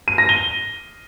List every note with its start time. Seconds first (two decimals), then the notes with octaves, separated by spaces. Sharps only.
0.08 D#7
0.18 A#6
0.29 G7